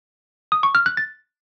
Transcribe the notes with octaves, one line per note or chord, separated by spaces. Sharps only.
D#6
C#6
F6
F#6
A6